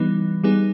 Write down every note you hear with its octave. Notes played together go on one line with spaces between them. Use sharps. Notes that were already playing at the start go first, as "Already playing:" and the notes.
Already playing: E3 G3 B3 D#4
G3 B3 D#4 G#4